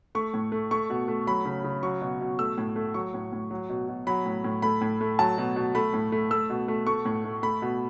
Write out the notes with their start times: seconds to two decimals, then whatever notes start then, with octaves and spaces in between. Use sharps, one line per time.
0.15 A3 C#6
0.34 A2
0.52 A3
0.71 A3 C#6
0.90 B2
1.08 A3
1.27 F#3 B5
1.45 C#3
1.64 C#3
1.83 F#3 C#6
2.01 B2
2.21 B2
2.39 A3 E6
2.58 A2
2.76 A3
2.94 F#3 C#6
3.14 A2
3.32 A2
3.51 F#3
3.69 B2
3.88 B2
4.07 F#3 B5
4.26 A2
4.44 A2
4.62 A3 B5
4.81 A2
5.01 A3
5.19 F#3 A5
5.38 B2
5.56 B2
5.75 A3 B5
5.93 A2
6.12 A3
6.31 A3 E6
6.50 B2
6.68 A3
6.87 A3 C#6
7.05 A2
7.25 A3
7.43 A3 B5
7.62 B2